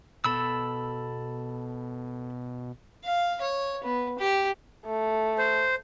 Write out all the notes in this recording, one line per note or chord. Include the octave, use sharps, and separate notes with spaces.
B2 A4 B5 E6
F5
C#5
B3
G4
A3
C5